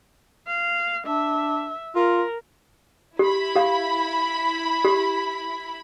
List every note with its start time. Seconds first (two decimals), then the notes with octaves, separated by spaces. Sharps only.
0.47 F5
1.07 D4 E5
1.96 F4 A#4
3.19 E4 G4 B5
3.56 G4 F5
4.85 G4